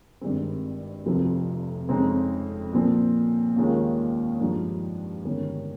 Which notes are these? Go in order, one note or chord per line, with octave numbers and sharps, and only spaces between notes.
G#1 G2 D#3 G#3 C4
F1 F2 C3 F3 C4
F2 C#3 G#3 C4 D#4
A#2 F3 C4
D#2 D#3 G#3 C#4 F4
G2 F3 G#3 D#4
G1 G2 D#3 G#3 C#4